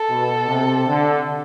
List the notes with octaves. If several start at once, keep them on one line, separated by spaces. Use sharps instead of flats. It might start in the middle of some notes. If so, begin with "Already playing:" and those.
Already playing: A4
B2
C3
D3